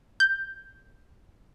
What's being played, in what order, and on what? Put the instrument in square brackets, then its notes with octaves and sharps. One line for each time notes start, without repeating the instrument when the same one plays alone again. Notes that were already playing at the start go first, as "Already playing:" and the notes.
[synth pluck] G6